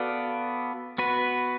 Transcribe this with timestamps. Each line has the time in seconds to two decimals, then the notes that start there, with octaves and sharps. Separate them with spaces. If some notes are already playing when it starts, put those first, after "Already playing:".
Already playing: B3 F#4 A4 D5 F5
0.98 B3 F#4 B4